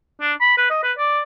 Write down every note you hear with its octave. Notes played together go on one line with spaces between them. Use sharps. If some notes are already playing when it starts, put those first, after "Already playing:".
D4
B5
B4
D#5
B4
D5